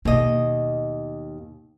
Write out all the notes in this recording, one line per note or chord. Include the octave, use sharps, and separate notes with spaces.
D#2 B2 D#5